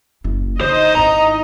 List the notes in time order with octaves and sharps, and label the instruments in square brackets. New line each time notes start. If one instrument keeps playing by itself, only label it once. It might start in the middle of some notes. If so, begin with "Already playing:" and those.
[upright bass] F#1 E4
[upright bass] D3 [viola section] D#4 D#5 [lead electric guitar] C5
[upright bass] G#1 E4 [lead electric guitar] A#5